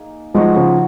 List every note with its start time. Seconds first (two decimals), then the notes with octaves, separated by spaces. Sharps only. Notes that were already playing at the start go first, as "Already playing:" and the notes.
Already playing: A#3 D#4 G#4
0.34 F3 G#3 D#4 F#4 C#5
0.56 C#3 F3